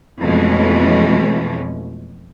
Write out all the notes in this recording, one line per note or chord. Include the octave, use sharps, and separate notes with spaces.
F2 B2 E3 G#3 A3 C#4